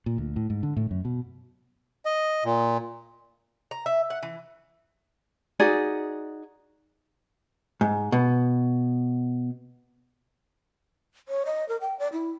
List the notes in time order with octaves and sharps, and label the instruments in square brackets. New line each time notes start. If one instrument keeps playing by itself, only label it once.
[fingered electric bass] A#2
D2
A2
G#2
D3
A2
F#2
B2
[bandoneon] D#5
A#2
[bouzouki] A#5
E5
F#5
E3
[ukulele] D#4 F#4 G#4 D5
[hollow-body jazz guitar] G#2
B2
[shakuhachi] C#5
D#5
A#4
G5
D5
E4